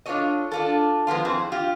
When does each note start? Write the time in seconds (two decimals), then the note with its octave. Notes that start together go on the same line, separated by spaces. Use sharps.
0.06 D4 F4 G4 A4 C#5 D#5
0.51 D4 F4 A4
1.07 F3 G#3 B3 F4
1.25 F2 C4 E4 G#4
1.52 F4 G4